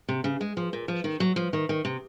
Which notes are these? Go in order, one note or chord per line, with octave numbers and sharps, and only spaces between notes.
C3
C#3
G#3
F3
A#2
F3
D#3
F#3
F3
D#3
D#3
C3